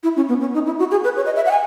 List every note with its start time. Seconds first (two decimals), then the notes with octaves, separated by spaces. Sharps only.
0.03 E4
0.16 C#4
0.29 B3
0.41 C#4
0.54 D#4
0.66 E4
0.79 F#4
0.91 G#4
1.04 B4
1.16 C#5
1.26 D#5
1.36 E5
1.46 F#5
1.51 G#5